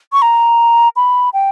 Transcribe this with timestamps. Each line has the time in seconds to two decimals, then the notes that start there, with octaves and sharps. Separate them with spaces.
0.13 C#6
0.22 A#5
0.96 B5
1.33 G5